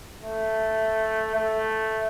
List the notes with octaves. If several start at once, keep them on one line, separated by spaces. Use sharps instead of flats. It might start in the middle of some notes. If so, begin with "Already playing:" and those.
A3
A3